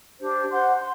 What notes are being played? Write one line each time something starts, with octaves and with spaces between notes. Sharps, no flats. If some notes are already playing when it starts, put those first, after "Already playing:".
D4 G4 C5
C5 F#5 C6
C6